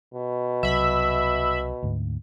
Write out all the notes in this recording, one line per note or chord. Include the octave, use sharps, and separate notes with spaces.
B2
C2 F#3 E5 B5
D2 G#2